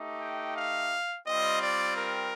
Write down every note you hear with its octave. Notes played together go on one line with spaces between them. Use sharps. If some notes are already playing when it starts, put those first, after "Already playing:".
Already playing: A3 D#4 G4
G5
F5
G3 C4 F4 D#5
D5
A#4